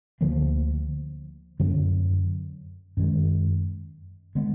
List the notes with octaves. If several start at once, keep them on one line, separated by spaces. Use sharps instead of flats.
D2 D3 F3 A#3
F#2 D3 F#3
F#2 D#3 G#3
D3 G#3 B3